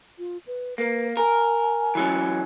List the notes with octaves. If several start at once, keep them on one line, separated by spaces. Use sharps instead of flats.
F4
B4
A#3 B4
A#4 G#5
E3 F#3 C#4